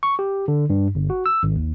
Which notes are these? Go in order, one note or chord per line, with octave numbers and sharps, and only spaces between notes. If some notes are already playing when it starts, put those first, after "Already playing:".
C#6
G4
D3
G2
G1
F#4
E6
G#1
D#2